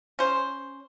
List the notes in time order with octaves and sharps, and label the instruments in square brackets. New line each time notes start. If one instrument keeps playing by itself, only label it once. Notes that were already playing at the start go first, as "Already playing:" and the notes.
[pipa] C#4 C5